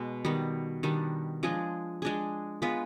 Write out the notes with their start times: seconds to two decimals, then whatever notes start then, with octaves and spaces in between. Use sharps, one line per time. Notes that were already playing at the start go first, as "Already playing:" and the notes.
Already playing: B2 G#3
0.25 D#3 G3 B3
0.83 D#3 G3 B3 D4
1.43 F3 G#3 D4 G#4
2.02 G#3 D4 G#4
2.62 G#3 B3 F4 B4